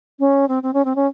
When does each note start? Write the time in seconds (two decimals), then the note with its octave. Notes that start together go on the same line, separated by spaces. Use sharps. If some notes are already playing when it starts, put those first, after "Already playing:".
0.19 C#4
0.48 C4
0.63 C4
0.73 C#4
0.85 C4
0.96 C#4